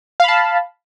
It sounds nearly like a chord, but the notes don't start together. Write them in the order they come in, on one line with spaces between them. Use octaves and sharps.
F5 B5 A5